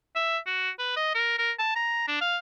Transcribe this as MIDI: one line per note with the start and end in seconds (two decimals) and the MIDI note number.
0.15 0.38 76
0.46 0.70 66
0.79 0.92 71
0.96 1.12 75
1.15 1.38 70
1.38 1.52 70
1.59 1.74 81
1.75 2.04 82
2.07 2.20 62
2.21 2.37 77